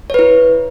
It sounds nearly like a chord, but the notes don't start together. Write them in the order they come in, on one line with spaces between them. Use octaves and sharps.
C#5 B4 E4